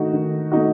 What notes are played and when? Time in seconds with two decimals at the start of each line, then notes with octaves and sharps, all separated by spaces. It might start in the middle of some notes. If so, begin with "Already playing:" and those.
Already playing: D#3 A3 D#4 F#4
0.13 D#3
0.51 A3 D#4 F#4